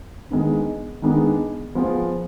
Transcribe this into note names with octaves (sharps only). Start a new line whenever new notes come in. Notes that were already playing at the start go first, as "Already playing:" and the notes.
D#3 G#3 B3 D4
D#3 G#3 B3 D4
F3 B3 F4 G#4